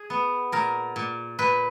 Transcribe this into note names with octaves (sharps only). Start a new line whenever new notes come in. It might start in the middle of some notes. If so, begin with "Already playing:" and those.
Already playing: G#4
B3
A#2 A#4
A#2
A#2 B4